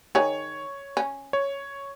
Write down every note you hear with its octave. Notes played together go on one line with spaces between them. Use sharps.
D#3 G#4 C#5
C#4
C#5